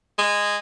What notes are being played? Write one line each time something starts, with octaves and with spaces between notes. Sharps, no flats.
G#3